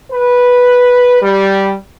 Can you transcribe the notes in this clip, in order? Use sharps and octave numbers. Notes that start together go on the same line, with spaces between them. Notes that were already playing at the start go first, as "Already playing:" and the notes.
B4
G3